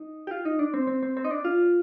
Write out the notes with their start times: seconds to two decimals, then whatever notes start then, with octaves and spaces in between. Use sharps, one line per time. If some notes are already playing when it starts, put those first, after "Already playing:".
Already playing: D#4
0.27 G4
0.31 F4
0.45 D#4
0.59 D4
0.74 C4
0.87 C4
1.03 C4
1.17 C4
1.25 D#4
1.31 D4
1.45 F4